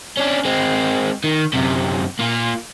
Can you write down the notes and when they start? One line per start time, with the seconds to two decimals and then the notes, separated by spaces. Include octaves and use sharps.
0.17 C#4 D4
0.45 G#3 C4
1.24 D#3
1.53 F#2 C3
2.19 A#3 F4